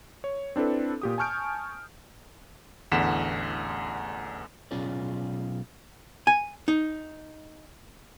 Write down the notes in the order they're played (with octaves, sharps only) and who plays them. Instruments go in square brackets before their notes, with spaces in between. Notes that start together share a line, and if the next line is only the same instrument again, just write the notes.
[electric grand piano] C#5
C4 D4 E4 A4 B4
A#2 G4 D#6
G#5 A5 C#6 F6 G6 D7
A1 E2 D3 F#5 B6 E7
[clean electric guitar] B1 C#4 F4 G#4 C#5 D5
[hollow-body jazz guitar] G#5
D#4